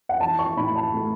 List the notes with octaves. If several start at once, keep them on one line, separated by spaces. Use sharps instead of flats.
F#5
E3 A5
C#6
A2 B5
A5
A3